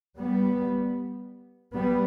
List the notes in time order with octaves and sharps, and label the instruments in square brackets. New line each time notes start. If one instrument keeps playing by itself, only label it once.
[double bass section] G3 B3
G3 B3